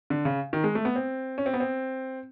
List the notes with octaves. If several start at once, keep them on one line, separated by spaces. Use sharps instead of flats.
D3
C#3
D#3
G#3
A3
B3
C4
C#4
C4
B3
C4